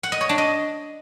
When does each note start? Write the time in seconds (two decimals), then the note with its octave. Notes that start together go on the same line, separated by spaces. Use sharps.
0.03 F#5
0.12 D#5
0.21 C#5
0.29 D4
0.38 D#5